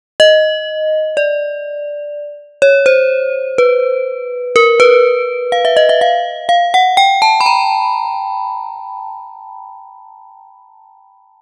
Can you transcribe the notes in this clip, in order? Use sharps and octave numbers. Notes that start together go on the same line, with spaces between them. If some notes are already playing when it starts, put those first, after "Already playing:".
D#5
D5
C#5
C5
B4
A#4
B4
F5
E5
D#5
E5
F5
F5
F#5
G5
A5
B5
A#5